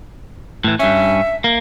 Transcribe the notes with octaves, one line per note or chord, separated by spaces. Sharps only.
A2 E3
G2 C#4 E5
A#3